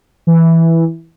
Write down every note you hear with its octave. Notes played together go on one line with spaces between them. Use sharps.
E3